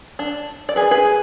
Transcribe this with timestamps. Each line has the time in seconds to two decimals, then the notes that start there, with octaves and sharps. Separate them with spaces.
0.19 D4
0.69 D5
0.76 G#4 B4
0.91 G#4 B4